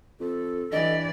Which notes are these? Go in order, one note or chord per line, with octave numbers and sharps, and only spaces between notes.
F2 A4
G2 E3 D5 D#5